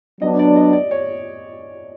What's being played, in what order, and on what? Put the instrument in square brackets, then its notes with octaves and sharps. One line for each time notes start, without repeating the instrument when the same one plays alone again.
[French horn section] F#3 B3 D4 [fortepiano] D#5
[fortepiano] D5
D#5
D5
C#5